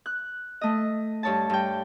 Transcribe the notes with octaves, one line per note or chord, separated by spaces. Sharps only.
F#6
A3 D#5
G2 C#5 A5
G2 G5